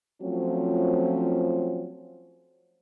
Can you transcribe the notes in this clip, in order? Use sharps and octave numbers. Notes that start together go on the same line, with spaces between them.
F3 F#3 A3 C4 C#4 F4